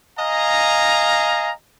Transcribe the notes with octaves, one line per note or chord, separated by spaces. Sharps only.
D#5 F5 G#5 A#5